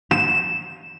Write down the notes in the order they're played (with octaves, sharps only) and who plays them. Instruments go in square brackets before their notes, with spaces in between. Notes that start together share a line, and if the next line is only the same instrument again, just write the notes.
[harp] E7